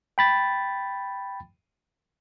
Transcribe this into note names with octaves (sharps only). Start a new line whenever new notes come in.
G5 B5 A6